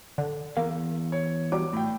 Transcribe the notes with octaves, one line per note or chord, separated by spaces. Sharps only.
D3
E2 A#3
C#5
F#3 G3 D6
A2 G5